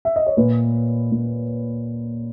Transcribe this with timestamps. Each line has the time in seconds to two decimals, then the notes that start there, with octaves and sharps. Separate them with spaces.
0.05 E5
0.16 D#5
0.26 C#5
0.37 A#2 B4
1.11 A#2